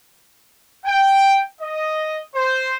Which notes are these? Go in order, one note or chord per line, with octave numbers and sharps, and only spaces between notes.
G5
D#5
C5